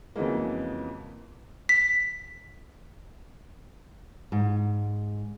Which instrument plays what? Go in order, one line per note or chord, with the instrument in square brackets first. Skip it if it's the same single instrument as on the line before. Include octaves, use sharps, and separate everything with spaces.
[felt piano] F2 C#3 E3 F#3 G#3 A#3
[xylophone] B6
[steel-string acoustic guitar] G#2